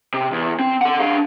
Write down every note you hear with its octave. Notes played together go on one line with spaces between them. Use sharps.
C3
E2
C4
A4 F#5
D4 F5